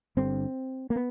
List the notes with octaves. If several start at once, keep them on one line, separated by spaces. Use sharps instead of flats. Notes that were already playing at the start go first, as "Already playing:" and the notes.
G1 G2 D3 C4
A#3
B3